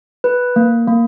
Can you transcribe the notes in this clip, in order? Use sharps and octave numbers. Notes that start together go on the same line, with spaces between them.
B4
A#3
A#3